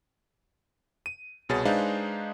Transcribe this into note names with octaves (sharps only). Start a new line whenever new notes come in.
D#7
C2 B2 G#4 C#5 A6
G#3 D4 D#4 B4 C5 F5